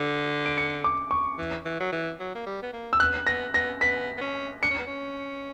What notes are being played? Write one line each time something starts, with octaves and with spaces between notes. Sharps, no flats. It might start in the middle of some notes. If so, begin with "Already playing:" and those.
Already playing: D3
D7
C#7
D6
C#6
E3
E3
F#3
E3
F#3
A#3
G3
B3
A#3
E6
B3 F#6
B3 A#6
B3 A#6
B3 B6
B3
C#4
D4 C#7
C#4
B3
C#4